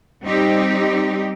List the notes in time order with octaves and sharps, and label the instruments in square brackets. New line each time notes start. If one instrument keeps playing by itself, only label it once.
[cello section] G3 C4 D#4 G4